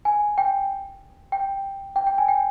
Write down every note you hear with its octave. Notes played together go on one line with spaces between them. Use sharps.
G#5
G5
G5
G5
G5
G#5
G5